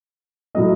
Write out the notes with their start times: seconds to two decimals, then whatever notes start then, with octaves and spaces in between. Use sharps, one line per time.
0.55 A2 F#3 A3 D#5